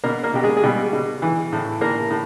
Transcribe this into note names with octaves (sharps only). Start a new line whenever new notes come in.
B2 A#3 A#4
A#3 A#4
B2 G4
G#3 G#4
G#4
B2 G3 G4
B2
E3
A2
A2 A#3 A#4
A2